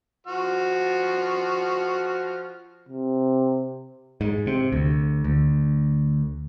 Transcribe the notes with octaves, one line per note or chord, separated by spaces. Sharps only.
F3 F#4 F6
C3
G#2
C3
D2
D2